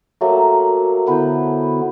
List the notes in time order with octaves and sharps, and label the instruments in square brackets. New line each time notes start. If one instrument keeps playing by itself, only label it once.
[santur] F#3 A3 A#3
[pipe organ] D3 B3 E4 [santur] B4 C5